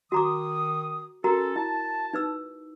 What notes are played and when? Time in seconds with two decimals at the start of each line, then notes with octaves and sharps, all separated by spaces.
0.12 D#3 F#4 A#5 D6 D#6
1.24 C#4 F#4 A4 A#4 A#5
1.56 E4 A5
2.13 D#4 B4 E6